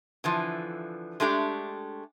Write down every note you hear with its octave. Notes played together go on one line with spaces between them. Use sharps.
D3 E3 F3
G#3 A3 D4 G4